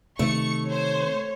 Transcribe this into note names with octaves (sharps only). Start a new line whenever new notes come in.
C3 D#3 A3 C#6 C#7
C5 C#5